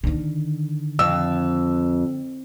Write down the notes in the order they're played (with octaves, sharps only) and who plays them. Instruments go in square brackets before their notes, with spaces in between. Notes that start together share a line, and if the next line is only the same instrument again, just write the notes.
[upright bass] D3 D#3
[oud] F2 [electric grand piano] E6